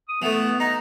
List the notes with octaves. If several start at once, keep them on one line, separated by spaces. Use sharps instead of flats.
D#6
E3 A3 B3
D#4 A#5